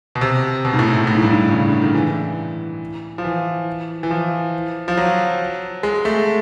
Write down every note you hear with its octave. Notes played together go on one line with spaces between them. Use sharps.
B2
C3
B2
G#2
A2
A2
G#2
G2
G#2
C#3
D3
D#3
E3
F3
E3
E3
F3
F3
F#3
G#3
A3